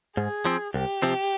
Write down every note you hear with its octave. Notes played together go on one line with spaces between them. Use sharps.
G#2 G#4
F3 C4
C2 G4
C3 F3 C4